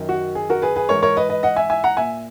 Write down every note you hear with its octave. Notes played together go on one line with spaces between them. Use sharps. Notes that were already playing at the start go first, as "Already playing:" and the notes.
Already playing: F#2 D#3
F#4
G#4
F#4 A#4
G#4 B4
G#4 B4
G#2 E3 A#4 C#5
A#4 C#5
B4 D#5
B4 D#5
D#5 F#5
E5 G#5
E5 G#5
F#5 A#5
A#2 E5 G#5